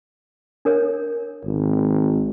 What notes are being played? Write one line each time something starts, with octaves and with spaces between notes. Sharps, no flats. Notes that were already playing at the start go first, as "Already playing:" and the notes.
D4 A#4 C#5
G#1